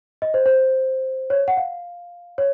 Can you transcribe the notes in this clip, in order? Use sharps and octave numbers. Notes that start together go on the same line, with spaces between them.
D#5
C5
C5
C#5
F#5
F5
C#5